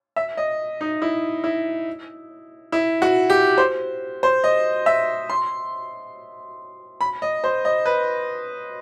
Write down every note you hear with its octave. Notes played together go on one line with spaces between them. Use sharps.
E5
D#5
D#4
E4
E4
E4
F#4
G4
C5
C5
D#5
E5
C6
B5
D#5
C5
D#5
B4